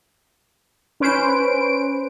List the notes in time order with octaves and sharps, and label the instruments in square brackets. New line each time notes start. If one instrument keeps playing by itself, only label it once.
[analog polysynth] C#4 B4 C5 D7